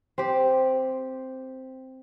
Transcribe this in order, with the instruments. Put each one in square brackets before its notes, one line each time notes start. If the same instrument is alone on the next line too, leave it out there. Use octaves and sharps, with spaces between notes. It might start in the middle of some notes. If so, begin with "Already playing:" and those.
[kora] C4 G4